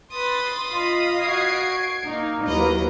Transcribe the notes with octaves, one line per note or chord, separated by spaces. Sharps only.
B4 B5 C6 D#6 A6
F4 D#5 F5
F#4 G#6 C7 D7
A#3 D#4
D#2 F#3 E4 A#4 B4 D#5 A#5